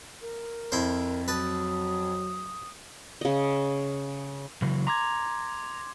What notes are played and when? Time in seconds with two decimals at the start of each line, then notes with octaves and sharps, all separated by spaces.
0.22 A#4
0.72 F2 E4 C5
1.28 F#3 B4 A5 D#6
3.21 C#3 D#5
4.62 C#3 E3 F#3
4.87 A#5 C6 D6 G#6